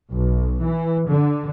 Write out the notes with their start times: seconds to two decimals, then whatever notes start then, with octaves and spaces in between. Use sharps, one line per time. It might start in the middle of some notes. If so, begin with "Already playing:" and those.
0.11 B1
0.64 E3
1.09 D3